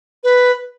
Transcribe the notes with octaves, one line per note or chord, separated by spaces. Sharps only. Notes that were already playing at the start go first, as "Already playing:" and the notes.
B4